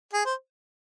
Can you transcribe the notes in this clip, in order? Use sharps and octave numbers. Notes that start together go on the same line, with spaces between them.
G#4
C5